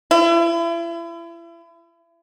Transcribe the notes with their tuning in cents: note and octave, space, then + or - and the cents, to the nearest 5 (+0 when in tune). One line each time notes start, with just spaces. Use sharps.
E4 +35